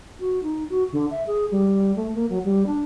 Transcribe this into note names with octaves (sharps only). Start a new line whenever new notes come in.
F#4
D#4
F#4
D3
E5
G#4
G3
A3
A#3
F#3
G3
D4